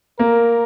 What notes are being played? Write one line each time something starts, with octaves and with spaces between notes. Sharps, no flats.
A#3 A#4